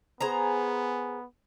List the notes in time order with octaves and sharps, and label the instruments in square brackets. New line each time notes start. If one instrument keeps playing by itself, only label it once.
[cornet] B3 [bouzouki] G#4 C5 A#5